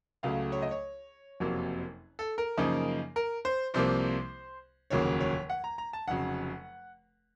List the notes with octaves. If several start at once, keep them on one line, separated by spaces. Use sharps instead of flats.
C#2 C#3 F#3 A3 F5
C#5
D#5
C#5
F#1 F2 C3 F#3 A#3
A4
A#4
F#2 C#3 F3 A#3 D#4
A#4
C5
C2 C3 F3 A#3 C5
F1 D#2 C#3 F#3 A#3 C#5
C#5
F#5
A#5
A#5
A5
F1 F2 C#3 F#3 F#5